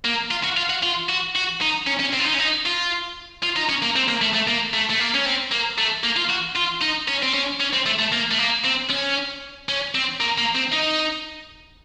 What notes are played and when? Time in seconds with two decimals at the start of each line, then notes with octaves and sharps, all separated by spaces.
0.05 A#3
0.31 F4
0.44 F#4
0.57 F4
0.70 F#4
0.83 F4
1.09 F#4
1.35 F#4
1.61 D#4
1.87 C#4
2.00 C#4
2.13 C4
2.20 F4
2.26 D#4
2.34 C#4
2.39 D#4
2.66 F4
3.43 F4
3.56 D#4
3.69 C#4
3.82 A#3
3.96 C4
4.08 A#3
4.21 A3
4.34 A3
4.48 A#3
4.74 A3
4.90 A3
5.00 A#3
5.14 C#4
5.26 C4
5.51 A#3
5.78 A3
6.04 A#3
6.17 F4
6.30 F#4
6.56 F4
6.82 D#4
7.08 C#4
7.22 C4
7.34 C#4
7.60 C#4
7.73 C4
7.86 A3
7.99 A3
8.12 A#3
8.31 A3
8.38 A#3
8.65 C4
8.90 C#4
9.69 C#4
9.95 C4
10.20 A#3
10.38 A#3
10.55 C4
10.72 D#4